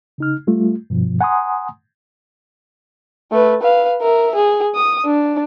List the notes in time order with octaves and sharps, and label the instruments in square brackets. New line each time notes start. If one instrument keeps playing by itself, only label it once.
[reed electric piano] C#3 D#4 F6
G3 A3 F4
G2 B2 F3
F#5 G#5 A#5 C6 D#6
[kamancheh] A3 B4
B4 F5
A#4 E5
G#4
D#6
D4